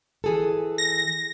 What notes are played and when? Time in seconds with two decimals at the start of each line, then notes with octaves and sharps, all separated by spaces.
0.24 E3 G#4 A4
0.78 A#6